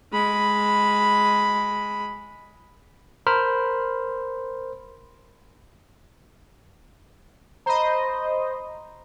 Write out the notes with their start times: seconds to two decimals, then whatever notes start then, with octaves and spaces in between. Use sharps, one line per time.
0.12 G#3 B5
3.27 A#4 C5 B5 F6
7.66 C5 D#5 A#5 B5